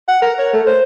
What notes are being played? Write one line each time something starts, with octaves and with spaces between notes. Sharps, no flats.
F#5
A#4
C#5
A3
C5